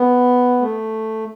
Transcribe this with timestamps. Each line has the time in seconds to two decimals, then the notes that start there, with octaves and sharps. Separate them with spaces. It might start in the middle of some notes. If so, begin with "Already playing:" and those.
Already playing: B3
0.61 A3